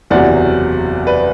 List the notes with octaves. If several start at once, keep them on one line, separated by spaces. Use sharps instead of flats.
F#1 E2 C3 F#3 D5 F#5
B4 D5